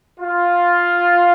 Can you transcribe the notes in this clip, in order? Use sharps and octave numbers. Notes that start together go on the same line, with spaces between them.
F4